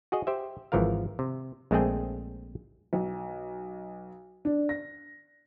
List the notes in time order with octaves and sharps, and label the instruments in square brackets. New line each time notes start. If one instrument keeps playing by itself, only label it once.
[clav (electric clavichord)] F#4 G#4 D#5
G4 C5 E5
G#1 E3 F3 A#4 F5
C3
A#1 G#3 A3 C4 G#4 G5
[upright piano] B1
D4
A#6